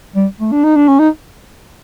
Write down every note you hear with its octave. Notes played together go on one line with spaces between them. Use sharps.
G3
A3
D4
D#4
D4
C#4
D#4